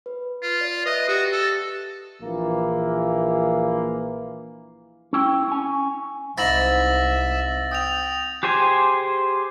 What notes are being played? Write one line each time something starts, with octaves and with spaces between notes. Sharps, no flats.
B4
F4
D5
B4 D#5 E5 F#6
F#4 G4
A4
A#1 E3 A#3
C#4 E4 G5
C#4 G#5
C2 G#2 E4 E5 A6 A#6 F#7
G5 D#6 F7
G4 G#4 C5 G#5